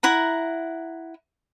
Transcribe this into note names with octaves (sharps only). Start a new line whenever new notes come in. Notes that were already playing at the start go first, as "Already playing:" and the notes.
E4 F#5 A#5